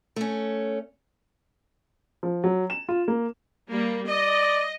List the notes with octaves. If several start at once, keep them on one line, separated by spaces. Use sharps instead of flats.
A3 C#4
F3
F#3
E7
F4
A#3
G3 A#3
D5 D#5